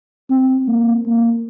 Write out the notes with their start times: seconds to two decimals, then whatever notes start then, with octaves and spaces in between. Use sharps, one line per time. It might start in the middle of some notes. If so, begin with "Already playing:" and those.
0.30 C4
0.68 A#3
1.06 A#3